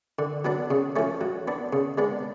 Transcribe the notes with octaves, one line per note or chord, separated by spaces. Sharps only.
D3
F#3 B3 D4
C#3
F3 A3 C#4
F#3
B3 D4
C#3
G#3 B3 D4